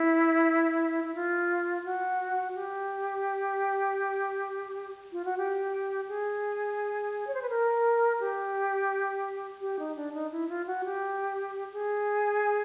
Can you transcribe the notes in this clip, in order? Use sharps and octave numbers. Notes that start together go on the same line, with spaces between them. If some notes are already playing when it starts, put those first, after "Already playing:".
Already playing: E4
E4
F4
F#4
G4
F4
F#4
G4
G#4
C#5
C5
B4
A#4
G4
G4
D#4
D4
D#4
E4
F4
F#4
G4
G#4